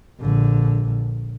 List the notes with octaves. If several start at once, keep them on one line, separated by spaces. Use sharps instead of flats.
A#1 D3